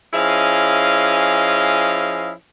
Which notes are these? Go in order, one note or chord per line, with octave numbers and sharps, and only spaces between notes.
F3 C#4 E4 G#4 D#5 F5